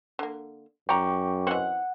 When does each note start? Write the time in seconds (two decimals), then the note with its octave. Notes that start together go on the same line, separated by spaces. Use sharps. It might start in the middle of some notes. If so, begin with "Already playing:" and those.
0.19 D3 A#3
0.89 F#2 D5 G5 A#5 C#6 D6
1.47 E3 C4 F#5